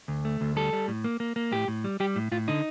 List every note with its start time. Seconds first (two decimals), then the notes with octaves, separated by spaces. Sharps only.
0.08 D2
0.25 A3
0.41 D2
0.56 G3 A4
0.73 G3
0.88 A2
1.04 A#3
1.20 A#3
1.36 A#3
1.52 A2 G4
1.68 A2
1.84 G3
2.00 G3 G4
2.16 A2
2.32 A2 F4
2.48 D3 D#4